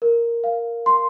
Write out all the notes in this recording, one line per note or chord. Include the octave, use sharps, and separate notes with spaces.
A#4
F5
C6